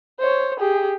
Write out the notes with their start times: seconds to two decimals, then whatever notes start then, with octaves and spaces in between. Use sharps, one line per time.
0.20 C5 C#5
0.60 G4 G#4